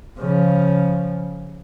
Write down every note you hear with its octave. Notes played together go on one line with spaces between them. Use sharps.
C#3 F3